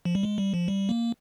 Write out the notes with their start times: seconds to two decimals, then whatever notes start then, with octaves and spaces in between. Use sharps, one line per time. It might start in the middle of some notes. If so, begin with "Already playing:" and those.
0.05 F3
0.15 G3
0.23 G#3
0.38 G3
0.54 F3
0.68 G3
0.89 A#3